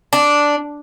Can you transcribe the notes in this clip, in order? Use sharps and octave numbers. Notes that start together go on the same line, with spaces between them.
D4